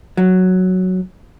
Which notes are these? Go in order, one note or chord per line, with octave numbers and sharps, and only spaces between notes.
F#3